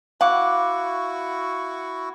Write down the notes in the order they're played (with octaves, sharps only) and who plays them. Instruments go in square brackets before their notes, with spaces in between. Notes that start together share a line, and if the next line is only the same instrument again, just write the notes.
[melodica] E4 F#4 C#6 [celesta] F5 [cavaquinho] F#5 D6